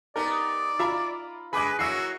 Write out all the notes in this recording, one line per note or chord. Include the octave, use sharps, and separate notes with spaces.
B3 D#4 G4 A#4 D5
F4 E5 A#5 B5
G#3 G#4 B4 B5 D6 F#6
F#3 A#3 E4 F#4 E6 C7